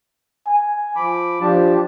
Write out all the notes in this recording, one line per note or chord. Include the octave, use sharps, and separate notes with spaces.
G#5
F3 B5 D6
F3 D4 G4 A5